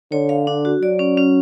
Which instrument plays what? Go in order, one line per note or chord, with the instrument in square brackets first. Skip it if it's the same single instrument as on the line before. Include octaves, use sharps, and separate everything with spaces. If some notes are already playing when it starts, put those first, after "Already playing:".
[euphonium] D3 [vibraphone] C#5
[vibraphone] F5
D4
F#4
[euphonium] F#3 [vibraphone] D5
[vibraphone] C#4
C#4